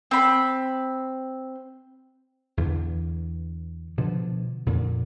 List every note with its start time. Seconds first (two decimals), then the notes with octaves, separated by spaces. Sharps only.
0.11 C4 B5
2.57 E2 D3 E3
3.98 B2 D3 F3
4.66 F2 A#2 D3